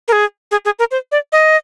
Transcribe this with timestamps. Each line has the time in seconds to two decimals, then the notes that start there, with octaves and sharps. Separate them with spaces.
0.08 A#4
0.12 G#4
0.51 G#4
0.65 G#4
0.79 A#4
0.91 C5
1.12 D5
1.32 D#5